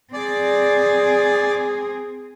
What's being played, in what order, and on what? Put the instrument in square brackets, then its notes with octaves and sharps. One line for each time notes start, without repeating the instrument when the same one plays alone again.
[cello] C4 G#4 [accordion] D5